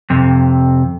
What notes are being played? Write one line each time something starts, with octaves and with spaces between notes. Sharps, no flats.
F2 C3